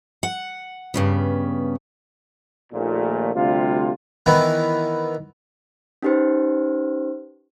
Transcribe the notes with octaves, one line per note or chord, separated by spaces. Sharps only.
F#5
G2 C#3 B3
A#1 D#2 A#2 A3
D2 C3 G3 F4
D#3 E3 B3 E4
C#4 D#4 G4 B4 C5